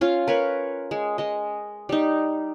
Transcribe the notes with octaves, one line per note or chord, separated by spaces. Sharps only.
C#4 F4
A#4 B4 C#5
G#3
G#3 D#5
G3 D#4